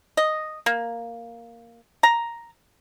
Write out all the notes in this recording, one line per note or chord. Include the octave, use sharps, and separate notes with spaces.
D#5
A#3
A#5